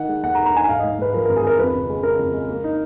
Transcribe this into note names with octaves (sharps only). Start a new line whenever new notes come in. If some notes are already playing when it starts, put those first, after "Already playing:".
Already playing: D#3 D#4 F#5
G#3
D#2 F#5
A#5
D#3
A#5
D#4 G#5
G#2 F5
G#2 D#5
G#2 B4
F3 A#4
G#1 A#4
G#4
G#1 A#4
F2 B4
C#3
G#3
C#3 A#4
F2
G#3
A#3
D#4